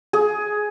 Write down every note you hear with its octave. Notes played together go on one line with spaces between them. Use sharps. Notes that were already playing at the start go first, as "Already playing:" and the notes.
G#4